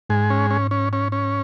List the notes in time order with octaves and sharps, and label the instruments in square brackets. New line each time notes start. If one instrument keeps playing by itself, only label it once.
[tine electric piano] G#2 [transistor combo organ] G#3
[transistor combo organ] C#4
C#4
C#4
C#4
C#4